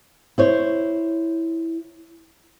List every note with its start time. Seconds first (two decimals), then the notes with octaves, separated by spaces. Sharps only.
0.38 E4 C5 C#5